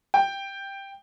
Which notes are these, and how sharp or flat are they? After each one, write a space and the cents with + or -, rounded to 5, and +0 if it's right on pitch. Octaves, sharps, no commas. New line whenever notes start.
G5 +5